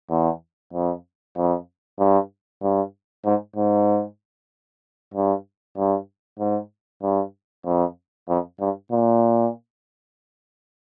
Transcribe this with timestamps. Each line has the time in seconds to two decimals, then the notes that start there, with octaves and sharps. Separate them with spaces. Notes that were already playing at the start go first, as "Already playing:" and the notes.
0.10 E2
0.73 F2
1.36 F2
1.99 G2
2.62 G2
3.25 G#2
3.56 G#2
5.14 G2
5.77 G2
6.39 G#2
7.03 G2
7.65 F2
8.29 F2
8.60 G2
8.92 A#2